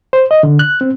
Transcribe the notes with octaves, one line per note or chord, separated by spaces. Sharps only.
C5
D#5
D3
F#6
C4